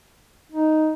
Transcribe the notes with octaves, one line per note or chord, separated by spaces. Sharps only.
D#4